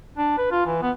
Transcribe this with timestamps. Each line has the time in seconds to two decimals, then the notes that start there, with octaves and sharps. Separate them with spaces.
0.17 D4
0.38 B4
0.51 F4
0.66 E3
0.82 B3